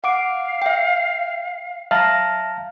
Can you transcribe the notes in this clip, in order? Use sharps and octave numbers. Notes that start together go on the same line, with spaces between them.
F5 F#5 D6 D7
E5 G5
E5 F5 A5 A#5 F6 A#6